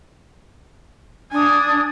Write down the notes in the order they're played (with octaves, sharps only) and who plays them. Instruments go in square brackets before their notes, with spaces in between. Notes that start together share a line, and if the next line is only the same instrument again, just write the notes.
[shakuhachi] D4 [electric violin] G#5 D#6